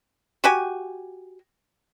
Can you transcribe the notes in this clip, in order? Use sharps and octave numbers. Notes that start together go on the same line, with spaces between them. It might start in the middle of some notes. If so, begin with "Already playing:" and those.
F#4 G4 G#5